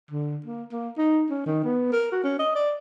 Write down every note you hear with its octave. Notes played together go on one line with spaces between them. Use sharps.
D3
A#3
A#3
D#4
C#4
D#3
B3
A#4
F#4
C#4
D#5
D5